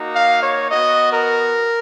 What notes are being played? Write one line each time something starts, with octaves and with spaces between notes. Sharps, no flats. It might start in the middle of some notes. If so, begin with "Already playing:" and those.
Already playing: A#3 D#4 F#4
F5
C#5
B3 F#4 D#5
A#4